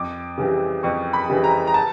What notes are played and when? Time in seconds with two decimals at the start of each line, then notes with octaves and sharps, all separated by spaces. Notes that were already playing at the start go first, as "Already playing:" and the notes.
Already playing: F2 D6
0.38 C#3 E3 G3
0.83 F2 C#6
1.13 B5
1.28 C#3 E3 G3
1.44 A#5
1.67 A#5
1.74 A5